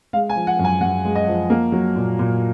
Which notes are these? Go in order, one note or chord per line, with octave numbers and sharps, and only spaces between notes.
G#3 F5
G#5
F3
F#5
F#2
G#5
F#2 F#5
G#3
D#5
F3
A#3
F#3
A#2
A#2